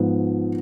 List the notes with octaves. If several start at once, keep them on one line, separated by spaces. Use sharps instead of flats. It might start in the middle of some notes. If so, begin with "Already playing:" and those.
Already playing: G#2 F3 B3